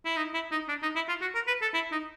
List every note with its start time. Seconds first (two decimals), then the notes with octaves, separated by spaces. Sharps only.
0.05 E4
0.17 D#4
0.34 E4
0.52 D#4
0.69 D4
0.82 D#4
0.96 E4
1.09 F4
1.21 F#4
1.35 A#4
1.47 B4
1.62 A4
1.74 E4
1.92 D#4